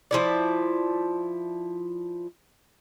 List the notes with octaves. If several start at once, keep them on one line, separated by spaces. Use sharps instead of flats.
F3 E4 D5